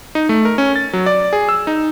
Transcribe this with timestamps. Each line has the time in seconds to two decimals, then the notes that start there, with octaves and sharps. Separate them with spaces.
0.15 D#4
0.29 A3
0.45 A#4
0.58 C#4
0.76 A6
0.93 F#3
1.06 D5
1.33 G#4
1.49 E6
1.67 D#4